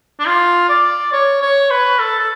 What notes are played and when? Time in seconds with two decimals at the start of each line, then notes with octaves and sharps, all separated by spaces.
0.19 D4
0.26 F4
0.69 D5
1.12 C#5
1.41 C#5
1.70 B4
1.99 A4
2.19 A4